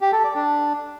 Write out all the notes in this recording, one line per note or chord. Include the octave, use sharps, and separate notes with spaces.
G4
A4
D5
D4